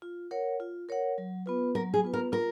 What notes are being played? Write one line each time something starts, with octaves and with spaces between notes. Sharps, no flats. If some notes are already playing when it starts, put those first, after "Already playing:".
F4
A#4 C#5 F#5
F4
A#4 C#5 F#5
F#3
B3 F4 B4
F#3 A#4
G#4
B3 F4 B4
A#4
F4 A#4